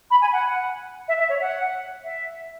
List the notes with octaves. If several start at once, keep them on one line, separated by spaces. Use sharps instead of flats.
B5
G#5
F#5
E5
E5
C#5
F#5
E5